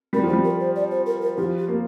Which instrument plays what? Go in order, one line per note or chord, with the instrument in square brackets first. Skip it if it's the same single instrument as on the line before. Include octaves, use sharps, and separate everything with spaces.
[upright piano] G3 [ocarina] A#4
[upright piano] F3
[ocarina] G4
[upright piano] G3
[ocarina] A#4
C5
D5
C5
A#4
A#4
[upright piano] F3 [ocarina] G4
[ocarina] G4
[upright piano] A#3